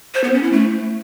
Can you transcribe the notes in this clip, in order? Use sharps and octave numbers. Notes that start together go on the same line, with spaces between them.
C5
B3
C#4
E4
A3